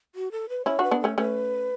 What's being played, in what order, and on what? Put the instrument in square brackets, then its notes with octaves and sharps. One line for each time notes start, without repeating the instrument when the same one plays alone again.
[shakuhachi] F#4
A4
B4
[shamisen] C#4 E4 [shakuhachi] C#5
[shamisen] D4 F#4 [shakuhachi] B4
[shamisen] B3 D4
[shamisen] A3 C#4 [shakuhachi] A4
[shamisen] A3 C#4 [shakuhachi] B4